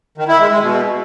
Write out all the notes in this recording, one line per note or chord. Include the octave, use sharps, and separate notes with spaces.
D#3
E4
G#3
G#3
B2